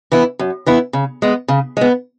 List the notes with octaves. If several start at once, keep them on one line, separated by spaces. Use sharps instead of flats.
E3 B3 E4
F#2
E3 B3 E4
C#3
G#3 B3
C#3
G#3 B3